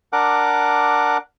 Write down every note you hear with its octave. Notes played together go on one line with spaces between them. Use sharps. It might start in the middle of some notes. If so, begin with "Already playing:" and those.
D4 A#4 F#5 D6